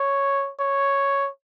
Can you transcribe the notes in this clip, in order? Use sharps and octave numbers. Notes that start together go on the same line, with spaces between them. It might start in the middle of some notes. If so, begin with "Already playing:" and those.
Already playing: C#5
C#5